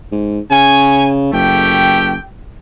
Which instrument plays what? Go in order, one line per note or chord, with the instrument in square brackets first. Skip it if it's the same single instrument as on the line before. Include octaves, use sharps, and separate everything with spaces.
[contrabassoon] G#2
[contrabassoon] C#3 [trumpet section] C#5 G#5
[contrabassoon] F#1 [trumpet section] A3 G4 G5